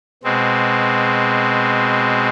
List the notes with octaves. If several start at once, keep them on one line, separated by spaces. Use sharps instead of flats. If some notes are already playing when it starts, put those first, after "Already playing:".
B2 G#3 C4